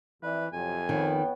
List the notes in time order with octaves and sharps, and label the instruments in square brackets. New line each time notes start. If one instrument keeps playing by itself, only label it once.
[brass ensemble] F2 D5 E5 [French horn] E3 [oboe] B4
[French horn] F2 [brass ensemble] C3 F#3 [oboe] G#5
[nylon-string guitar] D#3 [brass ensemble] B3 C#5 G5